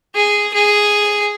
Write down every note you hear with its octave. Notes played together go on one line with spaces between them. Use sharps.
G#4
G#4